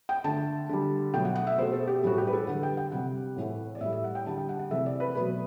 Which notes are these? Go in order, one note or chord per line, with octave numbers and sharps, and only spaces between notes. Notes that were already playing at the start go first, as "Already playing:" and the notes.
G5
D3 A3 A5
D3 G3
B2 F#3 A3 G5
F#5
F#5
E5
B2 A3 C5
A4
G4
A2 E3 G3 F#4
G4
B4
A4
D3 G3 F#5
G5
G5
C3 G3 F#5
A2 E3 A3
D5
A2 G3 E5
E5
F#5
G5
D3 G3 A5
G5
F#5
F#5
C3 E3 A3 E5
D5
B4
B2 F#3 A3 B4